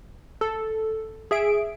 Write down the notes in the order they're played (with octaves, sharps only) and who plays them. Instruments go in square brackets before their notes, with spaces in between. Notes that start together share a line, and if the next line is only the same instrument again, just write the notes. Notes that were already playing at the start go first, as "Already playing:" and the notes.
[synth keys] A4
G#4 E5 D7